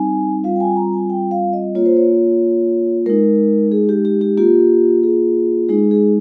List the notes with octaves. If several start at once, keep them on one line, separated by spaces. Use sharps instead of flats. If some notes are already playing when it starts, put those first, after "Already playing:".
Already playing: G3 C4 D#4 G#5
G3 C4 F4 F5
G5
G#5
A#5
G#5
G5
F5
D#5
A#3 F4 C#5
C5
C#5
G#3 D#4 A#4
G#4
G4
G4
G4
A#3 F4 G4
G#4
G#3 D#4 G#4
G#4